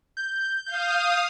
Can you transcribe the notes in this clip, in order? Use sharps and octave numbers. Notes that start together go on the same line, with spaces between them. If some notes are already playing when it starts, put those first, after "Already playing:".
G6
F5 D#6 G6